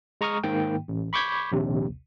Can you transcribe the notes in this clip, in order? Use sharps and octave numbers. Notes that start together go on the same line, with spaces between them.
G#3 A#5 C#6 D#6 F6
G#2 D#3 A#3 G5
A1
B5 C#6 D6 G6 G#6 B6
A#1 D#2 C3